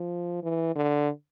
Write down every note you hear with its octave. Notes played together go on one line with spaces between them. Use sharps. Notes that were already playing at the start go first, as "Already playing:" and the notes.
Already playing: F3
E3
D3